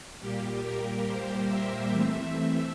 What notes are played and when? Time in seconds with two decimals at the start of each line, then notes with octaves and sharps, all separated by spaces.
0.21 A#2 G3 A#3 G4
0.63 A#4
1.05 C5
1.47 E5
1.90 E3 A3 C4 E5